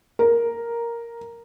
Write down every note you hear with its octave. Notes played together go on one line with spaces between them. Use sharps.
A#4